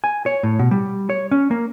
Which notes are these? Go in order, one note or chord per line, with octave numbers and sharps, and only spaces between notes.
G#5
C#5
A2
B2
G3
C#5
C#4
A#3